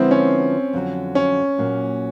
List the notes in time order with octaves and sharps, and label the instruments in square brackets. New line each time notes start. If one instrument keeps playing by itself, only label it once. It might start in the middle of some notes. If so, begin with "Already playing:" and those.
Already playing: [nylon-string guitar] D3 F3 G#3 B3 E4 [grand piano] C4
[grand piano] C#4
[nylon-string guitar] F2 D3 F#3
[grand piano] C#4
[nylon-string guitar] A#2 F#3 A#3